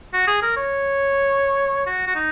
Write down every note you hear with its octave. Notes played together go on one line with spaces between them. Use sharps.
F#4
G#4
A#4
C#5
F#4
F#4
D#4